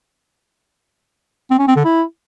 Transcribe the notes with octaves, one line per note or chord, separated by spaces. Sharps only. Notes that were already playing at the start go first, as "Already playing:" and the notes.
C4
C#4
C4
D3
E4